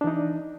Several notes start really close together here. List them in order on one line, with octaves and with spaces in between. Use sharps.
D4 E3 D#4